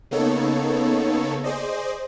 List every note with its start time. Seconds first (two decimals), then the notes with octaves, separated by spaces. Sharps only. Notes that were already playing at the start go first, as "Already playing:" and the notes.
0.11 C#3 A#3 B3 D#4 A4 C#5
1.44 G#4 C5 D5 D#5